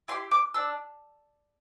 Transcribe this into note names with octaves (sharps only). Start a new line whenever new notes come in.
E4 G4 C6
D6
D4 E6